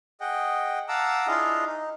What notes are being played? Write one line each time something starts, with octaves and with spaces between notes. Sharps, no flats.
G#4 D#5 F#5 G5
F5 F#5 A5 A#5 D6 E6
D4 E4 F4 G#4 D#5 F5
D#4